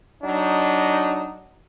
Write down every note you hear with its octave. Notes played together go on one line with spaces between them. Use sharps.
F#3 D4 D#4